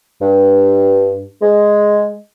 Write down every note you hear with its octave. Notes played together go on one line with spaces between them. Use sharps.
G2
G#3